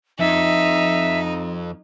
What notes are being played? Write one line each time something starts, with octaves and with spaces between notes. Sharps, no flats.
F2 D#4 E5